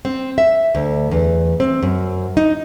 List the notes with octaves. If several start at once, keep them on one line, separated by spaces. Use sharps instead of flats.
C4
E5
D2
E2
C4
F#2
D#4